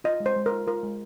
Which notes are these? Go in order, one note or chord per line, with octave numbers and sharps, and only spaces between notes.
F4 D#5
G#3
C5
G#3
A#4
F4
F4 A#4
G#3